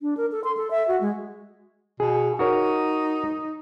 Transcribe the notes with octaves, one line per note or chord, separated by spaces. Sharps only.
D4
A#4
A4
C6
A4
E5
F#4
G#3
B2 G#4
D#4 F#4 A#4 C#5